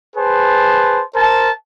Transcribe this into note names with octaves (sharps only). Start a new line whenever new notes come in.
G#4 B4 C5 A5
A#4 C5 A5